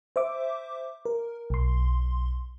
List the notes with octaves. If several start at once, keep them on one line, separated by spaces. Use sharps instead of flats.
C5 E5 D6
A#4
B1 C6